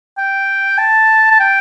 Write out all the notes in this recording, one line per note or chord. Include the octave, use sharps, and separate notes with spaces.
G5
A5
A5
G5